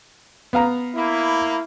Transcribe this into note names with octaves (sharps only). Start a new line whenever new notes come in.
B3 F5 A#5
A#3 E4 B5